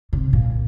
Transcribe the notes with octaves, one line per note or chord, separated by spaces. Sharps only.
C3
A#2